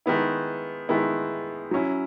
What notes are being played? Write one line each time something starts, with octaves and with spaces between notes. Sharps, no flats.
D#3 G#3 B3 E4
D#3 G#3 B3 E4
F#3 C#4 E4